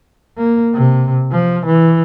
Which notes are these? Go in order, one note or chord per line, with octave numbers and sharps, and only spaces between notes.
A#3
C3
F3
E3